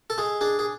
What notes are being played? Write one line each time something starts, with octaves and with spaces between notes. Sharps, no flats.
A4
G#3 G#4
D4 G#4
G#4